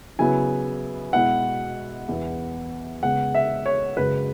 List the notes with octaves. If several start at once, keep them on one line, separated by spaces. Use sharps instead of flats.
C#3 F#3 B3 E4 G#5
B2 G#3 E4 F#5
E2 E3 B3 E4
C#3 G#3 B3 F#5
E5
C#5
F#2 C#3 G#3 B4